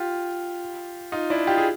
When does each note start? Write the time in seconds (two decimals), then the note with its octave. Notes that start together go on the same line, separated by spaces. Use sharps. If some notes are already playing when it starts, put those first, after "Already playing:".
Already playing: F4 G4
1.12 D#4 F4
1.30 D4 E4
1.47 F4 G4
1.58 G#4